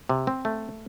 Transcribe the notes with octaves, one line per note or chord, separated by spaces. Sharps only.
C3
C4
A3